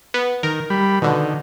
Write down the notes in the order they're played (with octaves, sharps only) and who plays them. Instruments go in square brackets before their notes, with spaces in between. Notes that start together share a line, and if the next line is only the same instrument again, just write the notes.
[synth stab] B3
[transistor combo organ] D#3 [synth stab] A#4
[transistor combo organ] G3 B5
[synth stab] B2 D3 [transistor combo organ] D#3